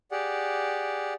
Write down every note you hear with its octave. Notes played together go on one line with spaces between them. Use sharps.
G4 G#4 D5 F#5